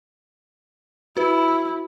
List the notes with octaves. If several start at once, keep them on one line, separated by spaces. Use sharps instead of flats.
E4 F#4 B4